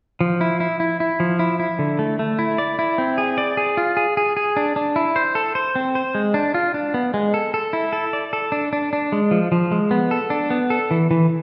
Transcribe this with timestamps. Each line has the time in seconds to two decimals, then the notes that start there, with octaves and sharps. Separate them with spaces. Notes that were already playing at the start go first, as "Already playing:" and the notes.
0.21 F3
0.41 E4
0.60 E4
0.80 E4
1.00 E4
1.20 F3
1.39 E4
1.60 E4
1.79 D3
1.99 A3
2.19 A3
2.39 E4
2.58 D5
2.79 E4
2.98 C4
3.18 G#4
3.38 D5
3.57 G#4
3.77 F4
3.97 G#4
4.17 G#4
4.37 G#4
4.57 D4
4.76 D4
4.96 E4
5.16 C5
5.35 A4
5.55 C5
5.76 C4
5.95 C5
6.15 G#3
6.34 D4
6.54 F4
6.74 D4
6.94 B3
7.14 G#3
7.34 A4
7.54 A4
7.73 E4
7.93 A4
8.13 D5
8.33 A4
8.52 D4
8.73 D4
8.93 D4
9.12 G#3
9.31 F3
9.52 F3
9.72 G#3
9.91 B3
10.11 A4
10.30 D4
10.50 B3
10.70 A4
10.91 E3
11.11 E3